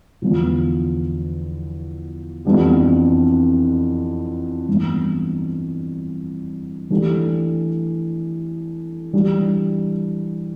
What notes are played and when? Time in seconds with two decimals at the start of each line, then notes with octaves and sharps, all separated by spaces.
0.22 E2 D3 F3 B3 F4
2.45 F2 E3 B3 D4 G4
4.68 G2 E3 B3
6.90 E3 A3 D4 G4
9.13 E3 G3 D4